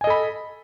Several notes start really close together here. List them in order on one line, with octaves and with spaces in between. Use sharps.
G#5 D#5 A4 B5